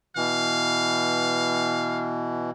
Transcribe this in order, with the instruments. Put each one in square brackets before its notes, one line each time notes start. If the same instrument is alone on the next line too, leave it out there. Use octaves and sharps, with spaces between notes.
[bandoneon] B2 E3 [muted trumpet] F5